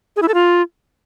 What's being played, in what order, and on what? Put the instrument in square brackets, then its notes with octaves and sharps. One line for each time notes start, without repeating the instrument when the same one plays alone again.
[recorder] G#4
E4
A4
F4